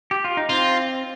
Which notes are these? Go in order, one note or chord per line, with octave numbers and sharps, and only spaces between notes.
G4
F4
D#4
C4 F4